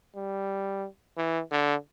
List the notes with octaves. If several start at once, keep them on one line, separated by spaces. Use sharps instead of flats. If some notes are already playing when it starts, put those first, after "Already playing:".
G3
E3
D3